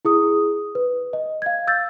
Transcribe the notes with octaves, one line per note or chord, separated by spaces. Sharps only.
E4 G#4 D#6
B4
D#5
F5 G#6
E6 G6 A6